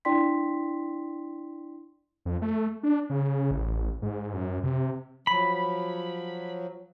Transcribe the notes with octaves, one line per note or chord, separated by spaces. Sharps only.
D4 E4 D5 G5 C6 B6
F2
A3
D4
C#3
A1
G#2
F#2
C3
F3 F#3 B5